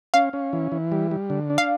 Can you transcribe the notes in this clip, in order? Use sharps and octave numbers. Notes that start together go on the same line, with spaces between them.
C#4 F5
C#4
E3
E3
G3
G3
D3
D4
F5